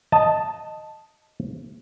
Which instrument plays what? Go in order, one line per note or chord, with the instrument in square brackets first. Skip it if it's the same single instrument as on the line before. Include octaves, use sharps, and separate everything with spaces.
[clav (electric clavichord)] D#5 A5